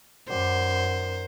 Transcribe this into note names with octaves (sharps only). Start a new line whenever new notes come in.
F#2 D#3 C5 D5 F#5